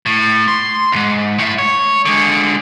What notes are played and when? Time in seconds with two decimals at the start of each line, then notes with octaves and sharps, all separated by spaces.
0.06 A2
0.48 C6
0.92 D2 G#2
1.39 A2 E5
1.58 C#5
2.06 D3 G#3